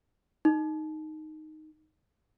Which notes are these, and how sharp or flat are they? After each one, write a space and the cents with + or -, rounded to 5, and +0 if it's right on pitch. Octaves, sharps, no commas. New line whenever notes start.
D#4 +0